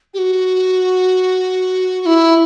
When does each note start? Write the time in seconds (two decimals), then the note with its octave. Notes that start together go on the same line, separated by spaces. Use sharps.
0.14 G4
0.18 F#4
2.01 F#4
2.06 E4